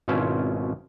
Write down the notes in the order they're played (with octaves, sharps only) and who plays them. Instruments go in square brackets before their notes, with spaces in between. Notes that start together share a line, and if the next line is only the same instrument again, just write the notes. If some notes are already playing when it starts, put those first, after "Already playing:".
[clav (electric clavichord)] G#1 B2 C#4 E4 F4 C5